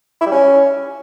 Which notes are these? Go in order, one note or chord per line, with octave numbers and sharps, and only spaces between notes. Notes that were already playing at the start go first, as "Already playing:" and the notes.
E4
G3
C#4